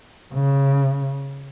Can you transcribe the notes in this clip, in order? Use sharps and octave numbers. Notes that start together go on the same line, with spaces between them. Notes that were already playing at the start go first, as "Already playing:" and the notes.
C#3